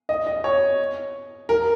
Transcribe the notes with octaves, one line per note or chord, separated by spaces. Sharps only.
D#5
D#5
C#5
A#4